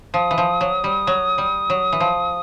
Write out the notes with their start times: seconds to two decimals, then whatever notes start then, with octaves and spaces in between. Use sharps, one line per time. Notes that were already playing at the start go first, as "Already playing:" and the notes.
0.14 F3 D#6
0.31 E3
0.38 F3
0.61 F#3
0.84 G3
1.07 F#3
1.38 G3
1.70 F#3
1.92 E3
2.00 F3